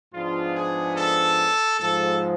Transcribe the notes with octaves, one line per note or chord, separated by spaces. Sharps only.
G#2 F3 G#3 B3 D4 F4
G#4
A4
G#2 F3 G#3 A4